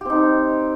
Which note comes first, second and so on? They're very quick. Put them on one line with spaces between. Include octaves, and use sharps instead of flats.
G4 C4 D#4